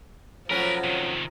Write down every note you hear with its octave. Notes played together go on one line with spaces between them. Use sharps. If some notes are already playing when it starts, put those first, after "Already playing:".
F3 F#3 A3 C#4 A#4 B4
C3 D#3